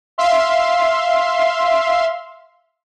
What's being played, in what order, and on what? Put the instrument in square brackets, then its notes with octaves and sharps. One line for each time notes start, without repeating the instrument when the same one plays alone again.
[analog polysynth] E5 F5 C6